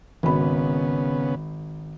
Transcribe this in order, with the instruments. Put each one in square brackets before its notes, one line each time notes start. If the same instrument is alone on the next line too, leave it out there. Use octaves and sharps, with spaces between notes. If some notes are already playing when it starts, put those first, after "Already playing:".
[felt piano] G#1 B5 [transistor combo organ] C#3 B3